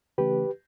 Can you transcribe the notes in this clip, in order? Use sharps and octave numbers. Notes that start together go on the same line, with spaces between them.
C#3 E3 A3 C#4 G4 B4